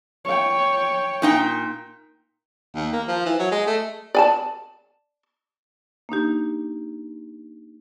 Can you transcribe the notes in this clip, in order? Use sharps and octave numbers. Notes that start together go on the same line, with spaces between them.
C#5 G5
A#2 D#4 G5
D#2
A#3
F3
E3
F#3
G#3
A3
D5 G#5 A5
A#3 D4 D#4 G4